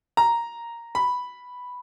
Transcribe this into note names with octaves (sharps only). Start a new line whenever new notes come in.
A#5
B5